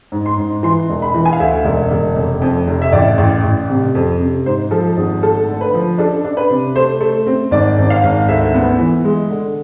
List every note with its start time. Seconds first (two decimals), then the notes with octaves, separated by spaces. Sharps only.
0.12 G#2
0.26 C6
0.38 G#2
0.63 E3 C6
0.90 E1
1.02 B5
1.14 E3
1.25 G#5
1.33 F5
1.40 D2 E5
1.65 E1
1.91 E1
2.16 F1
2.41 F2
2.67 F1
2.82 E5
2.92 A1 D5
3.18 A1
3.43 A1
3.70 C3
3.95 F2
4.20 C3
4.46 G#2 C5
4.71 F3 A4
4.97 G#1 G#4
5.23 A3 A4
5.48 D3
5.61 B4
5.74 F3
5.98 D4 A4
6.25 D4
6.37 B4
6.50 C3
6.76 A3 C5
7.01 A3
7.26 C4
7.51 G#1 D5
7.78 G#1
7.90 F5
8.03 G#1
8.28 D2 E5
8.54 B3
8.79 E3
9.05 G#3
9.30 D3